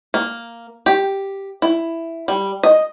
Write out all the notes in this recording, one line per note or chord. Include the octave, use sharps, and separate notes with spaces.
A#3
G4
E4
G3
D#5